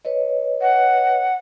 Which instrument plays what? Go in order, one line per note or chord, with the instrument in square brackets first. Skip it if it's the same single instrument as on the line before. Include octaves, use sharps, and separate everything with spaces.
[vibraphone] B4 C#5 D#5
[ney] F#5